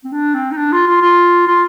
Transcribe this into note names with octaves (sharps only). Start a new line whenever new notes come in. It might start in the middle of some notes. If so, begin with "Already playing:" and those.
C4
D4
C4
D#4
D4
F4
F4
F4
F4